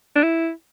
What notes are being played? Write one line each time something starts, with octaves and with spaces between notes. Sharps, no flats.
D4
E4